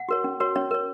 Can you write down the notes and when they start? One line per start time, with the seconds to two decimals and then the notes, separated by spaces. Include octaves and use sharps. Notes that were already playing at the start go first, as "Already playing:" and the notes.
Already playing: F#5
0.09 F#4 A#4 C#5
0.24 C#4
0.40 F#4 A#4 C#5
0.56 C#4 C#5
0.71 A#4 C#5